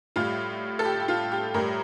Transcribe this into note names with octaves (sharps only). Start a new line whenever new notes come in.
A2 G3 F4
A4
G4
G4
F4
G4
A2 G3 A#4